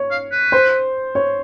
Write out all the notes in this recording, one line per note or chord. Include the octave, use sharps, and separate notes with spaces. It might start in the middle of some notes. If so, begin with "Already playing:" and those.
Already playing: C#5
F5
B4
C5
C#5